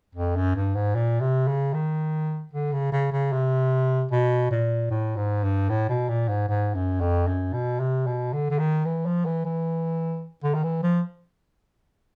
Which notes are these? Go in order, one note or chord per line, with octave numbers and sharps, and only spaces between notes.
F2
F#2
G2
G#2
A#2
C3
C#3
D#3
D3
C#3
C#3
C#3
C3
B2
A#2
A2
G#2
G2
A2
B2
A#2
G#2
G#2
F#2
F2
F#2
B2
C3
B2
D3
D3
D#3
E3
F3
E3
E3
D3
D#3
E3
F3